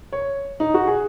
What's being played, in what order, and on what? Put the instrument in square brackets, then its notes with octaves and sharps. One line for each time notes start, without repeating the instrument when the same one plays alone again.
[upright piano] C#5
D#4
F#4
G#4